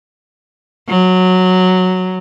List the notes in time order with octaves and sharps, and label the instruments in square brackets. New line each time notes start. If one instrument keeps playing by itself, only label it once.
[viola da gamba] F#3